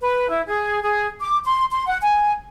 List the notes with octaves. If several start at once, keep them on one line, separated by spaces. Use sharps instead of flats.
B4
E4
G#4
G#4
D6
C6
C6
F#5
G#5